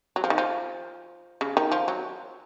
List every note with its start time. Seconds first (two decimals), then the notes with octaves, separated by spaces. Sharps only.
0.16 F#3
0.24 F3
0.30 D#3
0.38 F3
1.41 C#3
1.57 D#3
1.72 F3
1.88 F#3